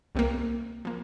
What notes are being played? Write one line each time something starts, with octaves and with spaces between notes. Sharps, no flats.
C2 C3 A#3
F3 A#3